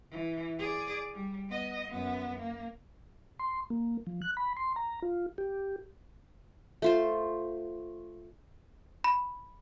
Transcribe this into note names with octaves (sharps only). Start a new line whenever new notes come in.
E3
G#4 D5
G3
B3 D#5
F#2 B3
A#3
C6
A#3
F3
F#6
B5
C6
A#5
F4
G4
A3 F4 C5
B5